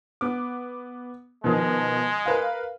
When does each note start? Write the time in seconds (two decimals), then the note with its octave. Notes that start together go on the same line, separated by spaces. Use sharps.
0.21 B3 D6
1.44 B2 D#3 F3 G#3
2.26 A#4 B4 F5